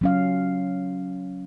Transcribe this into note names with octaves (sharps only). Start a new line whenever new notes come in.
F#3 C#4 F5